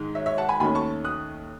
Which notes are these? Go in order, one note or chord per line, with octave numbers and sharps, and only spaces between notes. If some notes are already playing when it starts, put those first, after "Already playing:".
Already playing: G#2 D#3 G#3
C#5 E5
C#5 E5
F#5 A5
G#5 B5
D#2 D#3 A3 C#4 G#5 B5
A5 C#6
D#6 F#6